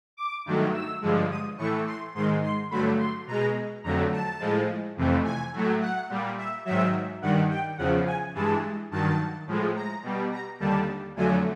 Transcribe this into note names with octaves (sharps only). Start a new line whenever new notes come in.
D6
G2 D#3 F#3 A3
E6
G2 D3 F3 G#3
D#6
A2 E3 A3 C#6
C6
G#2 D#3 G#3 C6
C6
G2 D3 F#3 A3 B5
C6
B2 G#3 A#5
F2 D3 F#3 A3 A#5
A5
A2 F3 G#3
F2 C3 E3 A3
G#5
A2 F#3 A3
F#5
A#2 G3
E5
G#2 D#3 F#3 E5
G2 D#3 G3 F#5
G5
E2 C#3 F3 F#5
G#5
G2 E3 G#3 A5
G2 D#3 F#3 A5
A2 F3 G#3
A#5
B2 G3
A#5
D#2 D3 G3 A5
F2 D3 F#3 A3 G#5